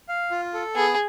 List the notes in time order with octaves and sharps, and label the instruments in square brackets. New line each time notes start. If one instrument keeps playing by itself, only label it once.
[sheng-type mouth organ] F5
F4
A4
[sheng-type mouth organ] B3 [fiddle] G#4